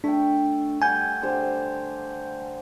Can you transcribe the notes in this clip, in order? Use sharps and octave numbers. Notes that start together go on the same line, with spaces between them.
A3 D4 G5
G3 F#5 G#5 G6
D3 G4 C5